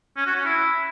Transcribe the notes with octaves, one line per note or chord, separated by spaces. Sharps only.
C#4
F#4
C#4
E4